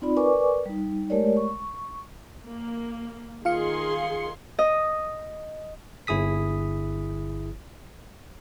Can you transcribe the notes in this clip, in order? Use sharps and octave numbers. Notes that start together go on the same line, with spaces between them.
C4 D#4 F4 D5 B5
A#4 B4 D5 G#5 C#6 D6
G3 D#4
G#3 A3 G4 A#4 C#5 D5
C#6
A#3
D#3 F4 G#4 F5 C6 C#7
D#5
G1 E4 G#4 D#6 B6